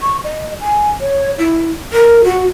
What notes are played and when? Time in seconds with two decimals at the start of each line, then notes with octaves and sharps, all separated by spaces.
0.02 C#6
0.24 D#5
0.61 G#5
1.01 C#5
1.39 E4
1.93 A#4
2.24 F#4